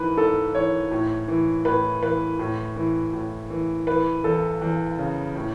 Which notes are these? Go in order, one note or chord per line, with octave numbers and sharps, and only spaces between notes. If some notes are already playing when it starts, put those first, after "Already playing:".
Already playing: G#2 E3 B4
G#2 A4
E3 C#5
A2
E3
A2 B4
E3 B4
A2
E3
A2
E3
E3 B4
E2 A4
E2
C#3
A2